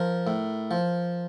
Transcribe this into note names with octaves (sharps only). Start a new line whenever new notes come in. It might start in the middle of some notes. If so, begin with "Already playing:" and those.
Already playing: F3 A#4
A2
F3